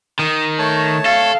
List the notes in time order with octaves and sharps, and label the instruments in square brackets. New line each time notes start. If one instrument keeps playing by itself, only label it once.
[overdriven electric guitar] D#3 [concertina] D#6
[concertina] A3 C#5 A5
[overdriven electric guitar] A4 [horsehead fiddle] F5